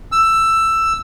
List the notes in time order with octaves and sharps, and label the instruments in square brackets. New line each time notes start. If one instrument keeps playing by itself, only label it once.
[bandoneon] E6